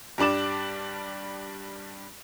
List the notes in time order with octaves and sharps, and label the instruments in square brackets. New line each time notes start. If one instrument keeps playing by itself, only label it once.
[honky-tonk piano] G2 G3 D4 D6 E7